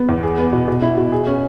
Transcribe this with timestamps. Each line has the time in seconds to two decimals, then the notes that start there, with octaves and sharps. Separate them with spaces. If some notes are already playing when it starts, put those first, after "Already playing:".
Already playing: B3
0.09 E2
0.23 G#4
0.38 B3
0.53 B2
0.68 B2
0.82 E4
0.97 B2
1.12 G#4
1.27 C#4